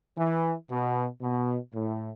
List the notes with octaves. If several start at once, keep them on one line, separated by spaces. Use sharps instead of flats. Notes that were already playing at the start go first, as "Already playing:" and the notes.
E3
B2
B2
A2